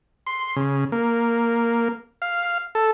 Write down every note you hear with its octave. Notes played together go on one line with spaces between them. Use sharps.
C6
C#3
A#3
F5
A4